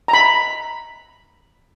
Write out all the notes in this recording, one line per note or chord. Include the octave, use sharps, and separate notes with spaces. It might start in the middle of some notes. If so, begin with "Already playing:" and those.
A#5
B5